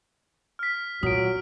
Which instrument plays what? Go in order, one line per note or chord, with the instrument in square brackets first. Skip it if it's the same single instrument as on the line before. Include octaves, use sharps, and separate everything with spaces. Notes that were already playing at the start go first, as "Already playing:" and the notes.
[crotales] F6 B6
[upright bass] A#2 [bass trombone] F#3 [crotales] D#6 D7